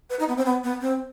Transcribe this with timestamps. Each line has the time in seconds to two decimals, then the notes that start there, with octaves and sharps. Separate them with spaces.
0.10 B4
0.19 D#4
0.28 B3
0.37 C4
0.46 B3
0.64 B3
0.81 C4